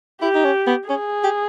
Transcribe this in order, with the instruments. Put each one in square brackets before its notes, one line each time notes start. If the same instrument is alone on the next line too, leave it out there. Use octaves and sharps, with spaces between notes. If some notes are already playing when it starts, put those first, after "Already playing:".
[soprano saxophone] E4 [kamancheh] G4
[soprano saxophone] D#4
C#4
B3
[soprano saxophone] C#4 [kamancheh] G#4
[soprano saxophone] G4